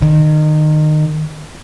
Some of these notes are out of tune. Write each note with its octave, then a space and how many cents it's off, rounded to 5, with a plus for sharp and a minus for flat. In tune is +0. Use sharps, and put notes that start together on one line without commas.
D#3 -25